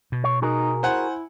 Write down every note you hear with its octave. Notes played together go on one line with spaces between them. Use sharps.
B2
C#5
D#4 F#4 G#4 A#4
E4 C5 F#5 G#5